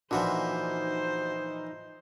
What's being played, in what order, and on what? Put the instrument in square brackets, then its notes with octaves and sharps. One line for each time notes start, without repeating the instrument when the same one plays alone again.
[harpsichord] A#2 E3 F3 [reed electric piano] D4 F#4 F#5 [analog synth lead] D#4 [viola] C5